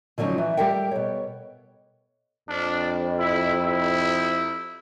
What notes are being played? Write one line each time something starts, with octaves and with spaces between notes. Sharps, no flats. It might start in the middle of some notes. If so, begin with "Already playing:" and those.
D3 F3 F#3 C#4 D#4
E3
G3 G4 A4 A#4 E5 G5
B2 C#5
F2 D4
E4
E4